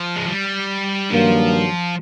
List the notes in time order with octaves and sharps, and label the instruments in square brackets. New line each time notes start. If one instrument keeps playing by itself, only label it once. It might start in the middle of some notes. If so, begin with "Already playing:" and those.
Already playing: [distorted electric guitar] F3
G#3
G3
[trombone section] G2 D#3 F#3 A#3 [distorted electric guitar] F3